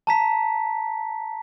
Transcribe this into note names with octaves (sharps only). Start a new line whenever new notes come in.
A5 A#5 B6